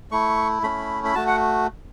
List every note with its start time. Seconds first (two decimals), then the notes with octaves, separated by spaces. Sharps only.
0.11 A3 E4 C#6
0.63 A3 C#4 E4 B5
1.05 B5
1.15 A3 F#4 A5
1.27 F#5